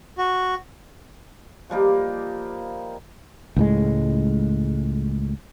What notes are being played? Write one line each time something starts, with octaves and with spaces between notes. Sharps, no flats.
F#4
F3 G3 A#3 D#4
C#2 A2 G#3